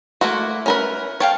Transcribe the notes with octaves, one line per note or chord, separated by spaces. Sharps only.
A3 A#3 E4 F#4 C6
C#4 A#4 B4
C#5 F5 G5 A5